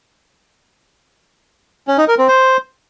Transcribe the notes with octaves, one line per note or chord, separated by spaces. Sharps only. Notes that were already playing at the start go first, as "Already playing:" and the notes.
C#4
D#4
A#4
C4
C5